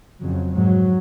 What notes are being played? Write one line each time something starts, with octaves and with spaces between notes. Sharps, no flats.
F2 C#3 F#3
G#2 F#3